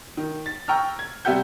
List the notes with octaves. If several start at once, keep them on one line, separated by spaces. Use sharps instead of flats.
D#3
A6
G5 A#5 C#6 E6 F6
G#6
C3 G3 G4 E5 F#5 G6